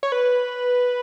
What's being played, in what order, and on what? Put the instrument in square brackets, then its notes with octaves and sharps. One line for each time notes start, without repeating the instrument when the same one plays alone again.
[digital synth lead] C#5
B4